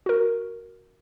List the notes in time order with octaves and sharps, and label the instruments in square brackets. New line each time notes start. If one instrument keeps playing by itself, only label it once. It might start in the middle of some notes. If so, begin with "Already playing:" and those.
[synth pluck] F#4 A#4